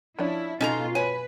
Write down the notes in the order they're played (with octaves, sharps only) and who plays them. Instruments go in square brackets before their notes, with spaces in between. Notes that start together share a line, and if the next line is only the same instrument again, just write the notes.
[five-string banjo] F3 C#4 D4 [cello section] E4
[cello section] B2 F4 [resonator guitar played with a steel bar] C#4 A5 A#5 [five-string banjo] D#4 A4
[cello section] B4 [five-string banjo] C#5 [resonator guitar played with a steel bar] G#5